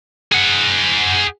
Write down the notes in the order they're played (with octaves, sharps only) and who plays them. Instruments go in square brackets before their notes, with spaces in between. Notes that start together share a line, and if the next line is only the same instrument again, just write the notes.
[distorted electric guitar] G#4 F#5